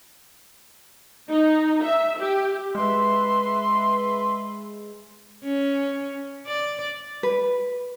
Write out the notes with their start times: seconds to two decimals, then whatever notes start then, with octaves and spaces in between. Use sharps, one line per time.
1.29 D#4
1.84 E5
2.19 G4
2.75 G#3 B4 E5 C6
5.43 C#4
6.47 D5
7.23 B4